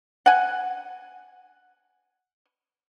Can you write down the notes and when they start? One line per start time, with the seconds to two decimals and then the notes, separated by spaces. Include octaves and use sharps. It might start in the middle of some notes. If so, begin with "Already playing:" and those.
0.26 F#5 G#5